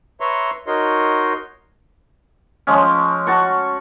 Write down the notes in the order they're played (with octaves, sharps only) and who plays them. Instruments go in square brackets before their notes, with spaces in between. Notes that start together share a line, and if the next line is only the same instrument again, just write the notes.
[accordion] B4 C#5 E5 A#5 C6 C#6
D#4 F#4 A#4 C#5 D#5 C6
[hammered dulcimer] F3 G#3 C#4
F#4 A5 C#6